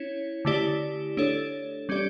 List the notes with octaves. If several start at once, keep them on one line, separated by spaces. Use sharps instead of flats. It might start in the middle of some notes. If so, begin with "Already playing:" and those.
Already playing: C#4 E4 C#5
D3 A3 E4 G4 D5
A3 D4 A4 C#5
G3 C#4 G4 D5